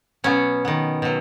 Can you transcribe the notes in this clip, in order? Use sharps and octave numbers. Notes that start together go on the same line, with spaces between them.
B2 F#3 B3 C#4
D#3 B3
B2 F#3